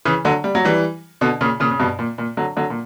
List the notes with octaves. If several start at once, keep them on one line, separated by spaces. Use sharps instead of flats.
C#3 E3
D3 F#3
G3
F#3
E3 G3
B2 D3
A#2 C#3
A#2 C#3
C#3
G2 B2
A#2
A#2
D3 F#3
D3 F#3
A#2